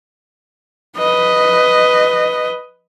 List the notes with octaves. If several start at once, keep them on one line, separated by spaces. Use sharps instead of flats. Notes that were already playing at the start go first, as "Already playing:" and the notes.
B4 D#5